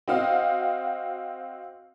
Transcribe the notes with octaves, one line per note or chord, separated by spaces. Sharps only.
C4 F#4 D#5 F5